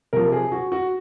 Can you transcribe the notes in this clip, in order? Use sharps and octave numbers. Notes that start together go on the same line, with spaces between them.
C3 F3 A#4
G#4
F#4
F#4